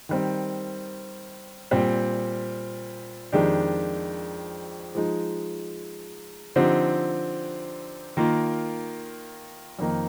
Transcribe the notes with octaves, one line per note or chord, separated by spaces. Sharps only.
D#3 G3 C4
A#2 G3 C4
F2 D#3 G#3 D4 G4
F3 G#3 D#4
D3 F3 C4 D#4 G4
D#3 A#3 F4
F2 D#3 A#3 D#4